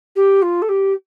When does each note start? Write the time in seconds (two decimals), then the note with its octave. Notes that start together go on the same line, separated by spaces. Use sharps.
0.16 G4
0.42 F4
0.62 A4
0.69 G4